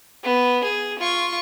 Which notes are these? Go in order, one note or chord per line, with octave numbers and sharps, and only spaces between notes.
B3
G#4
F4 C#6